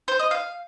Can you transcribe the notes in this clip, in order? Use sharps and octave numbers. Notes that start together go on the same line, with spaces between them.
C5
D#5
F5